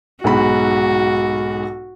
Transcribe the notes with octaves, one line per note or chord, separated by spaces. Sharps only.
B1 G#2 F#4 B5